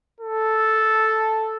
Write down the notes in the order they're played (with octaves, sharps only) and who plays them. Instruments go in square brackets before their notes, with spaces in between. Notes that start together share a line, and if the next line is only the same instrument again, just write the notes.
[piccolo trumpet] A4